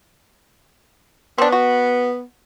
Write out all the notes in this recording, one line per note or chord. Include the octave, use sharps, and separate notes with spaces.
B3 C4 D4
F#4